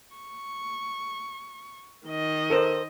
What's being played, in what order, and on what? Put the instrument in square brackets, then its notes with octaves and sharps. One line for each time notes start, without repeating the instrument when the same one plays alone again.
[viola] C#6
D#3 D#5
[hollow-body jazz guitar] A4 A#4 C5